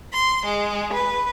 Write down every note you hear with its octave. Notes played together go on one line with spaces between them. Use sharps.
C6
G#3
B4